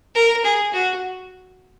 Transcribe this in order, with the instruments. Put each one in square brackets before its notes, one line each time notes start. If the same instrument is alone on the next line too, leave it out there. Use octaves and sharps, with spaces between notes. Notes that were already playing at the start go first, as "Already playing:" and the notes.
[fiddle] A#4
G#4
F#4